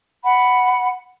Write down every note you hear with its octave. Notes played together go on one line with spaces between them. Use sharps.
F#5 B5